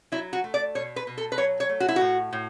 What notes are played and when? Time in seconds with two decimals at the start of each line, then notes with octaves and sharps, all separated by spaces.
0.12 F#3 E4
0.33 F#4
0.44 A3
0.54 D5
0.75 B2 C#5
0.96 B4
1.07 B2
1.18 A4
1.32 B4
1.38 F#3 C#5
1.60 C#5
1.69 A3
1.80 F#4
1.88 E4
1.96 F#4
2.01 A2
2.33 A2